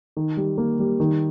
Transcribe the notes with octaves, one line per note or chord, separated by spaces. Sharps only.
D#3
G3
A#3
G3
D#3